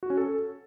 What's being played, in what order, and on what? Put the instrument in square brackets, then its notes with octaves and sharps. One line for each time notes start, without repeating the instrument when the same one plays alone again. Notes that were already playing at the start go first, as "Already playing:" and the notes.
[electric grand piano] F#4
C#4
A4